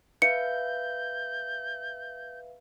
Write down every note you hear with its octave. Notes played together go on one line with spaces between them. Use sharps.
B4 E5 F5 G6 C#7